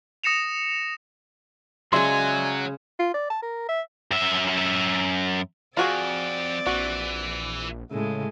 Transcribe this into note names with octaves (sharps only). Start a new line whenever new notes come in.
D#6 A#6 C#7 E7 F7
C#3 F#3 G#3 D5 E5 G#5 C6
F4
D5
A5
A#4
E5
F#2 E5
F2 C4 F4 F#4 G#4 D5
A#1 E3 F#4
A2 C#3 G#3